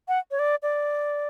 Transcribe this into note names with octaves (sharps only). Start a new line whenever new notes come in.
F#5
C#5
D5
D5